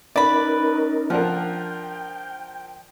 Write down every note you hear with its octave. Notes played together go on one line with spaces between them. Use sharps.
C#4 D#4 A#4 B4 D5 B5
F3 D4 A#4 F#5 G5